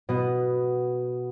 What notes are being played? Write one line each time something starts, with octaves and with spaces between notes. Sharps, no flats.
B2 B3